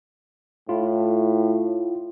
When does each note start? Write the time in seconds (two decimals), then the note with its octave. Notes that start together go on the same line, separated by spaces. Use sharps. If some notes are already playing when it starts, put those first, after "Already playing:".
0.69 A2 E4 F4